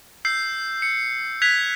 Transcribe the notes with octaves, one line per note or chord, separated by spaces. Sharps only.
E6 G6 C7
C#7
F#6 G#6 B6 F7